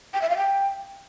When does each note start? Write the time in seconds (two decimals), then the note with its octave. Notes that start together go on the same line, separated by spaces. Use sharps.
0.14 G5
0.22 E5
0.29 F5
0.37 G5